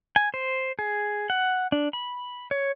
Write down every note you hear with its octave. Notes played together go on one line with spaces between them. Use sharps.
G#5
C5
G#4
F#5
D4
B5
C#5